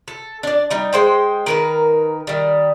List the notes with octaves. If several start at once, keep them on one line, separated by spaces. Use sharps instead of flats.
A4
D4 D5
G3 D#4
G#3 C5 G5
D#3 A#4 B4
D#3 G3